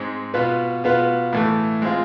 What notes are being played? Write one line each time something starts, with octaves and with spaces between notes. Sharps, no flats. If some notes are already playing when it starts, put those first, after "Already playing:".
Already playing: G#2 G#3 C4
B2 B3 F4 B4
B2 B3 F4 B4
A2 E3 A3
G#3 C4 F4